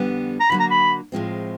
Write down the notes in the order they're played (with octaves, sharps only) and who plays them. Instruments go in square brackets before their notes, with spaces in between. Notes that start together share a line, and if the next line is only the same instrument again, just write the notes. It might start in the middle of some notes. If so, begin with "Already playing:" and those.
Already playing: [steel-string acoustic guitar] F2 D3 G3 B3
[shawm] A#5
[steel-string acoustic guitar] D3 F#3 A#3 [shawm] B5
[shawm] A#5
B5
[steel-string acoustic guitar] A2 F3 G#3 C4